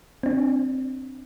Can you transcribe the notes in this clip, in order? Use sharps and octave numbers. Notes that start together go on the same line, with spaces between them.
C4 D4